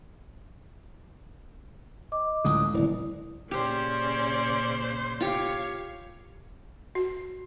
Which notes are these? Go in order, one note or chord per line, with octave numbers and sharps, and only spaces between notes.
D#5 D6
C#2 A2 D3 D#6
D1 E4 D5
A#2 C#3 C#4 G4 C5 D5
F4 G4 C#5 F5
F#4